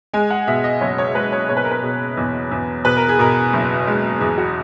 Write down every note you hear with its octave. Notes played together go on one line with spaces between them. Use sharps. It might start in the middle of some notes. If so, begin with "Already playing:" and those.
G#3 G#5
F#5
B2 E5
D#5
F#1 C#5
C#5
G#3 B4
C#5
B2 C#5
B4
A#4
B4
B2
E2
E2
B2 B4
A#4
G#4
B2 A#4
F#1
G#3
E2 G#4
F#4